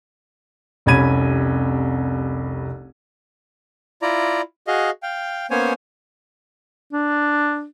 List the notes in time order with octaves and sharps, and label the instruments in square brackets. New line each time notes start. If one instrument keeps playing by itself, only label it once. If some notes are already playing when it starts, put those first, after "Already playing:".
[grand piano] F1 C2 C#4 B5 G#6 D#7
[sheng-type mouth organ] E4 F4 D5 A#5
F#4 G#4 D#5 F5
F5 G5
A#3 B3 C#4 C5 C#5 G#5
[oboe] D4